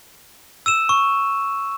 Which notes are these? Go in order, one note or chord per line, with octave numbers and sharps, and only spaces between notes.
E6 D#7 E7
C#6